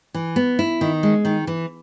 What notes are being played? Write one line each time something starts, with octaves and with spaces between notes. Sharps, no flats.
E3
B3
E4
D#3
G#3
D#3
E3